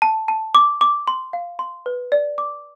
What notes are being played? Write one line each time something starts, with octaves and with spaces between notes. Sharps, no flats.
A5
A5
D6
D6
C6
F5
C6
B4
D5
D6